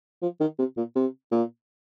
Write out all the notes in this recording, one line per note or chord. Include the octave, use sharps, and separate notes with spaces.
F3
D#3
C3
A#2
C3
A#2